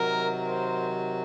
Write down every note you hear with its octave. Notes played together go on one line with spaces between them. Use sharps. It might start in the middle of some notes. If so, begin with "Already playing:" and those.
Already playing: C3 D#3 F#3 A#4
C5